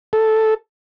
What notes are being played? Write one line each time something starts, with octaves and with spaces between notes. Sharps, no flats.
A4